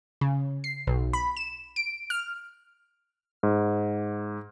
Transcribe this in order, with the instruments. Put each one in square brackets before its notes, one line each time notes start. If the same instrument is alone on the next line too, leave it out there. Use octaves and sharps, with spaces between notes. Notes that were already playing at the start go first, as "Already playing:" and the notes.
[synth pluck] C#3
C7
B1
B5
E7
D7
F6
[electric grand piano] G#2